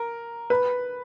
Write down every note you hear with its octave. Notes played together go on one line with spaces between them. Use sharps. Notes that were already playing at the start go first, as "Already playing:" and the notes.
Already playing: A#4
B4